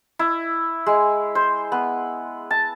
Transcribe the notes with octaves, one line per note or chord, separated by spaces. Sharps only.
E4
G#3
C5
B3
A5